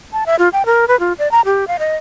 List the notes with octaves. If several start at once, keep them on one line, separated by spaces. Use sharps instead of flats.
A5
E5
F4
G5
A#4
B4
F4
D5
A#5
G4
F5
D#5